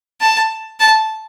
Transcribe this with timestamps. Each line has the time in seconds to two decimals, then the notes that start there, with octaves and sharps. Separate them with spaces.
0.20 A5
0.79 A5